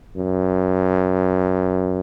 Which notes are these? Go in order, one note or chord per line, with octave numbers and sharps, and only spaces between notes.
F#2